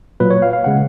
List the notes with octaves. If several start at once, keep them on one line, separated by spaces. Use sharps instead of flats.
A#2 F#3 B4
C#5
F5
F5
C#3 G#3 F#5